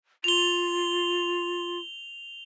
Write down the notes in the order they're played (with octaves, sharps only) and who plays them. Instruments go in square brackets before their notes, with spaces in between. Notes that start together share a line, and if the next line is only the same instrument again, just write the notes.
[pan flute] F4 [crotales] F7 G7